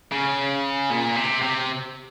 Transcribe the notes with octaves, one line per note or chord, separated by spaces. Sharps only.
C#3
A#2
C3
C3